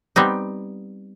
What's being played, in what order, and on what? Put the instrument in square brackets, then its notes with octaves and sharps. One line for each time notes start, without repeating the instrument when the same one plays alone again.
[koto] G3 B3 C4 D#4